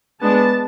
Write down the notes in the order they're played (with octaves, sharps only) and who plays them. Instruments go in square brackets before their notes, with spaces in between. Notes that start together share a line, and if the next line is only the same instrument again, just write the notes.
[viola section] G#3 B3 D4 A5